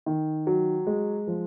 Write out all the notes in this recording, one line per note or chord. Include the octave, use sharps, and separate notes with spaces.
D#3
F#3
G#3
F3